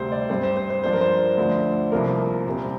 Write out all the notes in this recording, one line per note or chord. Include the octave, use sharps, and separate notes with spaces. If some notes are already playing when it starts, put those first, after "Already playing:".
Already playing: D2 C3 G3 C4 C5
D5
G2 G3 C4 C5
C5
C5
C5
G2 F3 D4 C5
A#4
C5
D2 D3 F3 D4
C2 C3 F3 A#3 A#4
C2 A#2 G3 C4